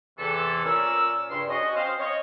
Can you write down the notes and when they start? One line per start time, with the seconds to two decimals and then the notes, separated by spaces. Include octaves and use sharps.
0.18 E2 C3 E3 A4
0.65 A#2 C#4 A#4 D5 E6
1.30 G2 C#3 C6
1.49 C#4 F#4 D#5
1.76 C4 C5 F5
1.99 C#5 D#5